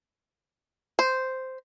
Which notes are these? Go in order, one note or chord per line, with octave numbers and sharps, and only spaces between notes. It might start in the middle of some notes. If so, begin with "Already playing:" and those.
C5